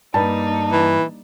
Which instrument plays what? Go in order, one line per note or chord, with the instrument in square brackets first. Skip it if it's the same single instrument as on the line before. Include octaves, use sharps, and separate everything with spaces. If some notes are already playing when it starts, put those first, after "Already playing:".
[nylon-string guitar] G2 [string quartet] A#3 D#4 [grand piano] A5
[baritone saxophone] E3